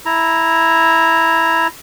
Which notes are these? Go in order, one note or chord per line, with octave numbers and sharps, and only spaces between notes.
E4 A#5